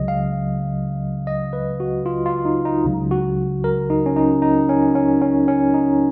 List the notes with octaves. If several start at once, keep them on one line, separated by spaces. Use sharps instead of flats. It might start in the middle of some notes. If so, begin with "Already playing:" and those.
Already playing: C#2 C#3 F#3 D#5
F5
D#5
B4
F#4
F4
F4
D#4
D#4
C#2 C#3 F#3
F#4
A#4
D#4
C#4
D#4
D#4
C#4
C#4
C#4
C#4
D#4